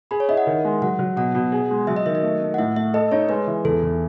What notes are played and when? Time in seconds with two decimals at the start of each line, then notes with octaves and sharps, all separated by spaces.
0.11 G#4 B5
0.20 C#5
0.29 E4 D#5
0.37 F#5
0.47 D#3
0.65 G#3
0.82 F#3 F#5
0.99 F#3
1.17 B2 F#5
1.35 B2
1.52 G#4
1.71 G#3
1.87 F#3 E5
1.96 D#5
2.06 D#3 E5
2.15 D#5
2.23 A3
2.41 A3
2.54 F#5
2.58 A2 E5
2.76 A3 E5
2.94 A4 D#5
3.12 D#4 C#5
3.29 G#3 B4
3.47 E3
3.64 E2 A4
3.83 E2